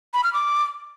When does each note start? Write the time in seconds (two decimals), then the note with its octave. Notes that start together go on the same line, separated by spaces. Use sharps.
0.14 B5
0.24 F6
0.33 D6